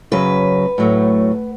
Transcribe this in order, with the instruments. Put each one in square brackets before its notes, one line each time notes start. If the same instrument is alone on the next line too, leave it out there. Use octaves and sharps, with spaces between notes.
[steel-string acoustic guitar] F#2 C#3 F#3 B4
A2 F#3 A3